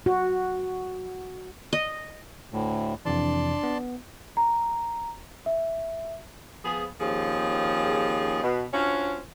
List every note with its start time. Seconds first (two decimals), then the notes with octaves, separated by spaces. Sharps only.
0.06 F#4
1.73 D#5
2.52 D2 A2
3.05 F2 C3 E3 D4 D5 A5 C6
3.63 B3
4.37 A#5
5.46 E5
6.64 F3 B3 G#4
7.00 D#2 F3 C4 C#4 G#4
8.43 B2
8.73 C#4 D4 F4 F#4 C5 C#5